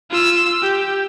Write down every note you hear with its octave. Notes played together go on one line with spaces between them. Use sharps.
F4 E6
G4